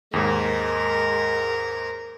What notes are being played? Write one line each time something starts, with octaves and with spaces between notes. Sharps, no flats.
D#2 G#2 G#3 A#4